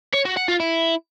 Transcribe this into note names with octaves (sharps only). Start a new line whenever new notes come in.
C#5
F#4
F#5
F4
E4